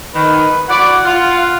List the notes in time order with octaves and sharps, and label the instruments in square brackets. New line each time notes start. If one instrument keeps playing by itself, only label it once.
[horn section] D#3 [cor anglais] B4
[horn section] E4 F#4 D5 [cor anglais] F#5
[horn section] F4